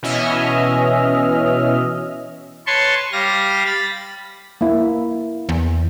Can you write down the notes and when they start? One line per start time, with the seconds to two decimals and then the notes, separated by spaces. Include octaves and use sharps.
0.03 B2 E3 C#4 D#5 E5 F6
2.67 B4 C#5 A5 C6 C#6
3.12 G3 F5 A#6
3.66 B5 A6
4.61 A#3 E4
5.49 E2